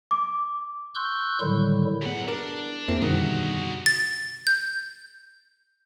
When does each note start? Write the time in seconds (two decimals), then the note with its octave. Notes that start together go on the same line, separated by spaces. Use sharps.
0.11 D6
0.95 C6 C#6 E6 F#6 G6
1.41 A2 D3 D#3 F#3 G3 E4
2.02 F#2 B3 E4 G#4 F#5
2.28 D4 A#4
2.88 F2 A#3 C4 E4 G#4
3.02 F#2 B2 D3 D#3 G3 D#4 F#4
3.86 A6
4.47 G6